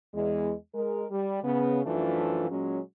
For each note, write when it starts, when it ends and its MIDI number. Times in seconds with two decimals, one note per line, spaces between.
0.14 0.52 40
0.14 0.52 56
0.74 1.06 56
0.74 1.06 70
1.11 1.40 55
1.44 1.82 49
1.44 1.82 59
1.85 2.50 42
1.85 2.50 52
1.85 2.50 53
1.85 2.50 57
1.85 2.50 62
1.85 2.50 65
2.51 2.79 46
2.51 2.79 54
2.51 2.79 56
2.51 2.79 61